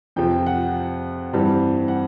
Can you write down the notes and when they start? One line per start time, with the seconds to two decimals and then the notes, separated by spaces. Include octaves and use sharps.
0.16 F2 C3 F3 G5
0.46 F#5
1.33 G2 E3 G3 C4
1.88 F#5